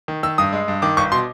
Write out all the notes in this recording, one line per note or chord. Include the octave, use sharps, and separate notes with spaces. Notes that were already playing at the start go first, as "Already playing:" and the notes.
D#3
D#3 E6
G2 D#6
G#3
G2
D#3 D6
G1 C#6
B2 C6